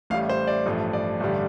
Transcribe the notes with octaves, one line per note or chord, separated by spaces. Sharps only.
A1 A2 G3 F5
C5
D5
A1 G2 F3 A3
D5
A1 G2 D3 G3